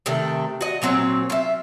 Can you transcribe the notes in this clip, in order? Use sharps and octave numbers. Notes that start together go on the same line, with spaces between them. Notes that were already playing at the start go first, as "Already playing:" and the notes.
C3 D#3 A3
F#4 D#5
A#2 F#3 C4 C#5
F4 E5